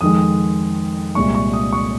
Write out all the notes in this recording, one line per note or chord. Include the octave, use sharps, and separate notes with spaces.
F2 D#3 G#3 D#6
C2 A#2 G#3 C#6
C#6
D#6
C#6